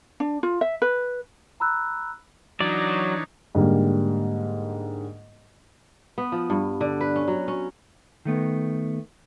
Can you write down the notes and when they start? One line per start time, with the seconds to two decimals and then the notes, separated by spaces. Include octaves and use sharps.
0.20 D4
0.43 F4
0.61 E5
0.82 B4
1.60 A#5 B5 E6 F#6
2.60 E3 F#3 D4 D#4 C#5 D5
3.55 G#2 D3 G3 A#3
6.18 B3
6.32 F3
6.50 G2
6.81 D3
7.01 B4
7.16 C#4
7.28 F#3
7.48 C#4
8.25 D#3 A3 B3